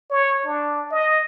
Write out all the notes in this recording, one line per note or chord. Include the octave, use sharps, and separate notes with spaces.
C#5
D4
D#5